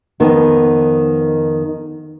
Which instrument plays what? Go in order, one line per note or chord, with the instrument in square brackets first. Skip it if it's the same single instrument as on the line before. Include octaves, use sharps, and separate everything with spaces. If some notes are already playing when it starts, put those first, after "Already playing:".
[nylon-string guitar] F2 D#3 B3